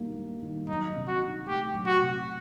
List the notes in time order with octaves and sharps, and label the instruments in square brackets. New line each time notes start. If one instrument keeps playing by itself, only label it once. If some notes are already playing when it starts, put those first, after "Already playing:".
Already playing: [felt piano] D#3 G3 A#3 D#4
G3
D#3
[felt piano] F#3 [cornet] D#4
[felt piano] C3
[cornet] F#4
[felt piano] D#4
[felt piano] A3 [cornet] G4
[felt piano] F#3
[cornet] F#4
[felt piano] C3